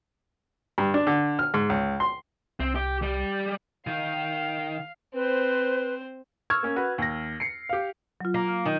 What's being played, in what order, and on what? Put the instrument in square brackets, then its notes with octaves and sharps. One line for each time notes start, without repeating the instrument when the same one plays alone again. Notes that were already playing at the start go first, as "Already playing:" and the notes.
[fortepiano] G2
D4
D3
F6
G#2
C#2
C6
[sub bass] C2 [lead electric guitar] C4
[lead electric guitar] G4
G3 G4
[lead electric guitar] D#3 [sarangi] F5
[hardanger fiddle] C4 C5 [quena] B4
[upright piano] C#6 E6 F6 G#6
A#3 C#4
F#4 B4
D#2 A#6
C7 C#7
G4 F5
[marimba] F#3 F4
[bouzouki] A#3
[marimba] F6
[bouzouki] D#3